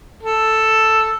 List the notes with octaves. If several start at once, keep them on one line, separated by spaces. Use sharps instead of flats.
A4